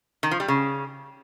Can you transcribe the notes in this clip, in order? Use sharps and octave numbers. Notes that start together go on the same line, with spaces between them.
D#3
F3
G3
C#3